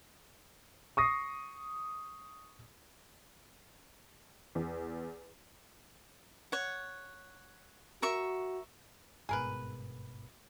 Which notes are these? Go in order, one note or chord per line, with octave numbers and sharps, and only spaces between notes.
C#6 D#6 A#6 C7
E2
C#5 F#5
F#4 A#4 E5 C#6
G1 G#2 B2 G#4 A#4 B4